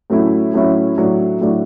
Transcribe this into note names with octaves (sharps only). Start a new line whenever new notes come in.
A2 F#3 A3 C#4 E4
A2 F#3 A3 C#4 E4
A2 F#3 A3 D4
A2 F#3 A3 D4